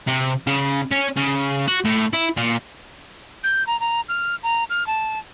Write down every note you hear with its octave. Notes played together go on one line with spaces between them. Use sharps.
C3
C#3
C#4
C#3
F#4
A2
E4
A#2
G6
A#5
A#5
F6
A#5
F6
A5